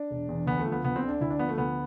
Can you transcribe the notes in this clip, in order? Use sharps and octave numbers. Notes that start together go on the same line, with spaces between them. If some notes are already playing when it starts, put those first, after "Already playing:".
Already playing: D4
E1
E2
D2 B3
A3
F3
B3
D2 B3
C4
D3
D4
D2 E4
D4
F3 B3
A3
D2 B3